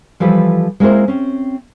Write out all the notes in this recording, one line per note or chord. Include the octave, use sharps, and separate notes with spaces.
E3 F3 G3 A4 B4
G#3 A#3 C4 E4 A#4 C5
C4 C#4